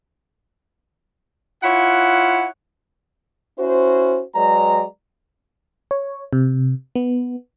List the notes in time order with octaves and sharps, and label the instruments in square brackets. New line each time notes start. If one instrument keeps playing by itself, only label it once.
[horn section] E4 F4 C#5 F#5
[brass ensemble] C#4 E4 F#4 C5
F#3 G#3 B4 D5 A#5
[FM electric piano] C#5
C3
B3